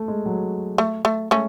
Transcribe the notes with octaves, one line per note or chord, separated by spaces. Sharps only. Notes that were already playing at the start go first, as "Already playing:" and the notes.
Already playing: A3
G#3
F#3
A3
A3
G#3 A3 C#4